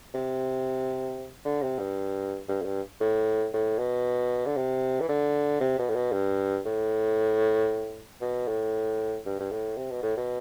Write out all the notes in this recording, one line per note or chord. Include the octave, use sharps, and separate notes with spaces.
C3
D3
C3
G2
G2
F2
G2
A2
A2
B2
D3
C3
E3
D3
C3
B2
A2
B2
G2
A2
B2
A2
G2
G2
A2
C3
B2
A2
B2